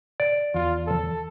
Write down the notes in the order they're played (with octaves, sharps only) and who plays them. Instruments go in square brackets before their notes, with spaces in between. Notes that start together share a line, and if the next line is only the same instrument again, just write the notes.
[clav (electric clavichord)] D5
[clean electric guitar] E2 [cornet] F4
[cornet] A4